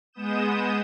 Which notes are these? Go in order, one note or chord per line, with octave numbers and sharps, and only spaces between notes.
G#3 B3 D#6 G6 E7